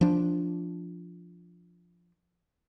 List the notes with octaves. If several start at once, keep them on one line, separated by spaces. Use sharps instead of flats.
F3 D4